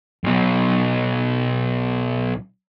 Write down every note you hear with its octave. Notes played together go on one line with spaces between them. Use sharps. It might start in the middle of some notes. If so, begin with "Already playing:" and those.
B1 B2